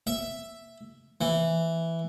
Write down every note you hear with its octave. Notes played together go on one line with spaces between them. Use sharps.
E5
E3